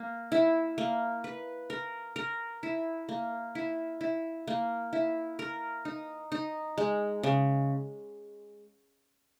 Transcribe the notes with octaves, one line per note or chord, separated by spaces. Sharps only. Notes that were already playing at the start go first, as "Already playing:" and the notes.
Already playing: A#3
E4
A#3
B4
A#4
A#4
E4
A#3
E4
E4
A#3
E4
A#4
D#4
D#4
G#3
C#3